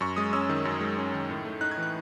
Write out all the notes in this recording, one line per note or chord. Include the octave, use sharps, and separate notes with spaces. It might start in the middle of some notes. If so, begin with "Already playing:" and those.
F#2 C#6
G#3 D#6
C#4 E6
D#3
F#2
G#3
C#4
D#3
A2
A3
D#4 F#6
G#6
E3 F#6